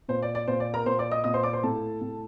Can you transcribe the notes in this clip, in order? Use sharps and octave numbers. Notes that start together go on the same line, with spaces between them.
A#2 C5
D5
D5
A#2 C5
D5
A#4 A#5
A#2 C5 C6
D5 D6
D#5 D#6
A#2 D#5 D#6
C5 C6
D5 D6
C5 C6
A2 A4 A5
A2